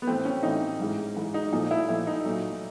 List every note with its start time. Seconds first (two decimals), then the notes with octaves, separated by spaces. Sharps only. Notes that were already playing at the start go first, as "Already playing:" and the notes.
0.02 B3
0.07 A2 E3 A3 C4
0.25 C#4
0.43 A2 E3 A3 D#4
0.79 G#2 E3 G#3
1.17 G#2 E3 G#3
1.34 D#4
1.52 A#2 F3 A3 D#4
1.71 E4
1.89 A#2 F3 A3 E4
2.07 D#4
2.25 A#2 F#3 A3